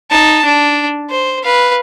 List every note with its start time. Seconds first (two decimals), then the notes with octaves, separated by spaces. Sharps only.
0.10 D#4 A5
0.45 D4
1.10 C5
1.43 B4 F5